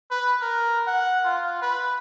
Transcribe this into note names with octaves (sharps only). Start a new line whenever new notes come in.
B4
A#4
F#5
F4
B4